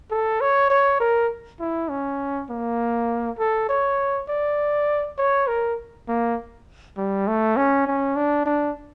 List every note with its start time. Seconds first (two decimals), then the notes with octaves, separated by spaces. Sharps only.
0.11 A4
0.41 C#5
0.70 C#5
1.00 A#4
1.60 E4
1.90 C#4
2.50 A#3
3.39 A4
3.69 C#5
4.29 D5
5.18 C#5
5.47 A#4
6.08 A#3
6.97 G3
7.28 A3
7.57 C#4
7.87 C#4
8.16 D4
8.46 D4